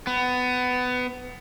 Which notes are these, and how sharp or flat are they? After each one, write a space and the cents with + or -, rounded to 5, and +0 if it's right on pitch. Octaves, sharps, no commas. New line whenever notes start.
B3 +20